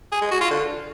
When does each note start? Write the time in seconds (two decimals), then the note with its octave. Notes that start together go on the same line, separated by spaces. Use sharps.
0.12 G#4
0.22 G#3
0.31 F#4
0.41 F4
0.51 D3